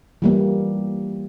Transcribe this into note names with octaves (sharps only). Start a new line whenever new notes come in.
E3 G3 A#3